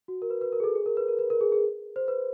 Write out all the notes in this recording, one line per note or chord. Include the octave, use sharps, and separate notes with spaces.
F#4
A#4
B4
B4
A#4
G#4
A4
G#4
A#4
B4
A#4
B4
A#4
G#4
G#4
C5
B4